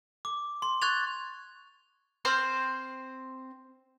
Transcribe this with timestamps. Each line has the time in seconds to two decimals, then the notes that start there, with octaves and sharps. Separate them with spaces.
0.25 D6
0.62 C6
0.82 C#6 F#6 G#6 A6 F7
2.25 C4 C5 C6 F6